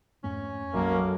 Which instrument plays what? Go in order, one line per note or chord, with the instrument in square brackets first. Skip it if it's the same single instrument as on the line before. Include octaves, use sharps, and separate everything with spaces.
[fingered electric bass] F2 G#2 A3 [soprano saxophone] C#4
[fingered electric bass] B1 D#3 F#3 [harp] F#2 G#3 A4 [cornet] A#3